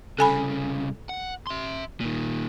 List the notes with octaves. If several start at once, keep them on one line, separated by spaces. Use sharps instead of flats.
C2 C#3 A4 G#5 B5
F#5
E5 C6
A#2 D#3